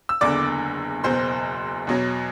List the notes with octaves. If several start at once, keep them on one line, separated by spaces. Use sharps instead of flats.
E6
F#1 E2 D3 D5 D6
F#1 E2 B2 C5 C6
E2 B2 F#3